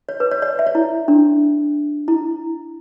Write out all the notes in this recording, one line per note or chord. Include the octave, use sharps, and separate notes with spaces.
C#5
B4
C#5
D5
E5
C#5
E4
D4
E4